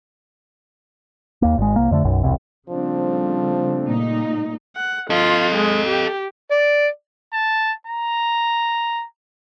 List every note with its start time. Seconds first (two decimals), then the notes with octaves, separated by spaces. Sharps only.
1.42 D#2 A#3
1.57 G#1 G#3
1.76 C2 A#3
1.91 F2 D3 A3
2.04 B1 F#2
2.23 E1 C2 C3
2.69 C#3 F3 G3 A3 C4 D4
3.86 A#2 D#4
4.76 F#5
5.10 F4 A4 D#5
5.55 G#3
5.88 G4
6.51 D5
7.34 A5
7.87 A#5